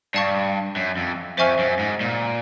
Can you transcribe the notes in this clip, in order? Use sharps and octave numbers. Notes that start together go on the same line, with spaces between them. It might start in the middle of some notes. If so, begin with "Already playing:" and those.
G2 D5 F5 A5 C#6
F#2
F2
F2 C5 E5 G#5 C#6 F6
F#2
G#2
A#2